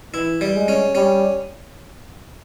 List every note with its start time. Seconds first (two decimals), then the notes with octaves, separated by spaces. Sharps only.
0.14 E3 E4
0.41 G3
0.55 G#3
0.68 C#4
0.95 G3 C#4